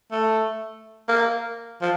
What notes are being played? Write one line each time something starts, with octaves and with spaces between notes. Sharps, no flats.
A3
A#3
F3